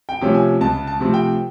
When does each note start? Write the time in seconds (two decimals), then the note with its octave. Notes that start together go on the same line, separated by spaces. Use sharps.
0.09 G5
0.21 C3 F3 A3 C#4
0.34 G#5
0.61 C#2 A5
0.87 A5
1.00 C3 F3 A3 C4
1.14 G5